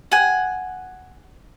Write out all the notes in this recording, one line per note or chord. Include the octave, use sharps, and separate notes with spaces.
F#5 G#5